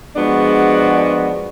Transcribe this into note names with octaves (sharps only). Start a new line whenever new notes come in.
F3 G#3 B3 D4 F#4